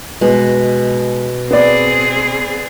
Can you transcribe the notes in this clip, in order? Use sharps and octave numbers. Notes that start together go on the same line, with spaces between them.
B2 G#3
B3 C4 G#4 D5